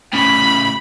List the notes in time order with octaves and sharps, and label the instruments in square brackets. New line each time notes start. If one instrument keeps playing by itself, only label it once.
[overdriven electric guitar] A2 C#3 [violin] B5